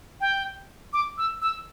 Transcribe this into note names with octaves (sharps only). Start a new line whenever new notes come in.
G5
D6
E6
E6